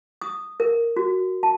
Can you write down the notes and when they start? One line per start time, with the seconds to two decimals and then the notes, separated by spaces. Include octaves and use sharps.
0.21 D#6
0.60 A#4
0.97 F#4
1.43 A5